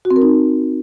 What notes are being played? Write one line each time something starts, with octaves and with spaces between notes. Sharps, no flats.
F#4
C4
A#4
D#4